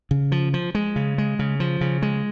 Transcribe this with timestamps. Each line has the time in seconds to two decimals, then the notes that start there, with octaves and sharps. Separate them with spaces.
0.11 C#3
0.32 F3
0.54 F3
0.75 G#3
0.96 C#3
1.18 G#3
1.39 C#3
1.60 F3
1.81 C#3
2.02 G#3